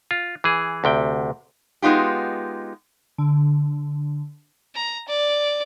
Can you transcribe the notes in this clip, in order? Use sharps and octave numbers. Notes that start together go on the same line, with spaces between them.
F4
E3 G#4
D2 C3 G5
G#3 B3 D#4 F4 G4
D3
A#5
D5